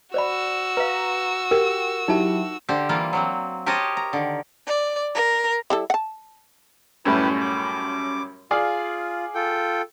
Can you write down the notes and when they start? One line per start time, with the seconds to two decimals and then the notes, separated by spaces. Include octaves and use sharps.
0.14 F#4 C5 D5 B5 E6
0.77 B4 F5 A#5
1.51 G4 A#4
2.08 F#3 D#4 E4 G4 A5
2.69 D3 G4 C5
2.89 E3 G3 A#3 F4
3.13 F#3 A#3 C4
3.66 G4 A#4 C5 C#5 D#5 A5
3.97 A#5
4.13 D3 D#3
4.67 D5
5.14 A#4
5.70 G3 E4 A4
5.90 F#5 A5
7.05 F#2 A2 G3 E4 G4 B4
7.40 D6
8.51 F4 G#4 D5 F5
9.35 F4 A4 G5